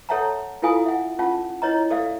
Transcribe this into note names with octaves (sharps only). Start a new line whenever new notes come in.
A4 C#5 E5 F#5 A5 A#5
E4 F4 A4 F5 G#5 D#6
E5 F#5
C#4 F4 F#5 A5
E4 C#5 D#5 A#5
A4 D5 E5 F5